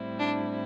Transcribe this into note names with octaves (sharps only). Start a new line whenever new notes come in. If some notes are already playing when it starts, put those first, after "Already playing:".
Already playing: A2 G3 C4 E4
D4